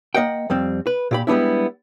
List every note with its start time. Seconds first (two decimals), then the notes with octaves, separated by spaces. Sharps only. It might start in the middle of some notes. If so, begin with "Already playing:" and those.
0.15 A#3 D#5 F#5 G5
0.50 F2 G3 C4
0.87 B4
1.11 A#2 G4 B5
1.27 G3 G#3 B3 D4 E4